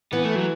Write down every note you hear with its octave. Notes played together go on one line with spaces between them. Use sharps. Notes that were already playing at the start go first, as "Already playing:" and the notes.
E3 B3
A3
F#3